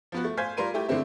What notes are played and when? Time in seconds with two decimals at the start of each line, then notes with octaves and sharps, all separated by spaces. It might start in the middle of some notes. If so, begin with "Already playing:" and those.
0.12 F3 B3 F#4
0.24 A3
0.37 C5 F5 G#5 G6 G#6 B6
0.57 G3 F4 A#4 C6 D#7
0.74 A3 E4 G4
0.88 D3 G#3 A3 C4 E4